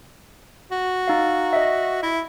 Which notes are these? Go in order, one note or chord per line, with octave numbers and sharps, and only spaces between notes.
F#4
D#4 F5
D#5 E5
E4